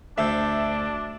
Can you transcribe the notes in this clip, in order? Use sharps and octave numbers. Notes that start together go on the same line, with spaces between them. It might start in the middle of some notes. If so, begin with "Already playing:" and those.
D2 D4 A4 C5 E5